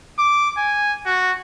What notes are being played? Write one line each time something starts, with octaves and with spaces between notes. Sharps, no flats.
D6
G#5
F#4